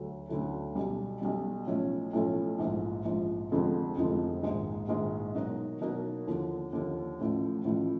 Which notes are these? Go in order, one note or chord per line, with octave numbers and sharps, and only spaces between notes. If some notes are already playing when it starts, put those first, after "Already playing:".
Already playing: D2 D3 F#3 A3
D2 D3 F#3 A3
B1 B2 G3
B1 B2 G3
B1 A2 F3 A3 C#4
B1 A2 F3 A3 C#4
A#1 G#2 F3
A#1 G#2 F3
F1 F2 D3 F3 G#3
F1 F2 D3 F3 G#3
A#1 G#2 D#3 G#3
A#1 G#2 D#3 G#3
B2 F#3 A#3 D#4 F#4
B2 F#3 A#3 D#4 F#4
D#2 D3 F3
D#2 D3 F3
A1 A2 F3
A1 A2 F3